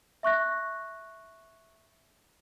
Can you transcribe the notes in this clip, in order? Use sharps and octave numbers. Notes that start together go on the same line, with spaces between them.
E5 C#6 F#6 A#6